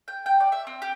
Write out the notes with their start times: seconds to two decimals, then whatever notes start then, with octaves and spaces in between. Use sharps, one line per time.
0.08 G5
0.26 G5
0.40 D5
0.52 E5
0.67 C4
0.82 G4